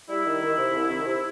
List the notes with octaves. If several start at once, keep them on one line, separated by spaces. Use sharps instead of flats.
G3 E4
D#3
D#3
C3
C2
D#3
C3